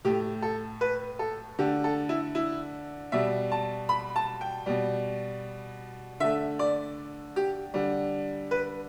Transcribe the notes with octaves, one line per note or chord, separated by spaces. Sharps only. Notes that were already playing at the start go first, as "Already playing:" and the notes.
A2 A3 G4
A4
B4
A4
D3 A3 G4
A4
E4
E4
B2 G3 E5
A5
B5
A5
G5
B2 G3
D3 A3 E5
D5
G4
D3 G3
B4